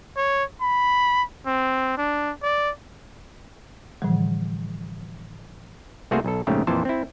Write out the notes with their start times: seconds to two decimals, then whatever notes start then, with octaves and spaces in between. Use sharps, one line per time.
0.17 C#5
0.61 B5
1.47 C4
1.98 D4
2.43 D5
4.02 A2 D3 E3 F3 G3
6.11 C2 A3 A#3 F#4 G#4 C5
6.25 B1 A4
6.47 A#1 G#2 C#3 A3 G4
6.67 F2 A#2 E3 C5 A5
6.85 C4 E4